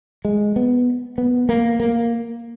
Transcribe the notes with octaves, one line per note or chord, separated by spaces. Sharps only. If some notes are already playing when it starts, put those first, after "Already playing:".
G#3
B3
B3
A#3
A#3